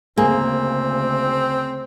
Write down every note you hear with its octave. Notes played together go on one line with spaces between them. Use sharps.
D2 C#3 A#3 C4 G#4